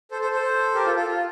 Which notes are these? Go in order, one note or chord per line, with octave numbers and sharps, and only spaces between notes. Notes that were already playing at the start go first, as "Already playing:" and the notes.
A4 C5
A4 C5
A4 C5
G4 A#4
F4 A4
F4 A4
F4